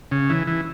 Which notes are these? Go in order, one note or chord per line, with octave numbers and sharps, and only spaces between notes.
C#3
E3
E3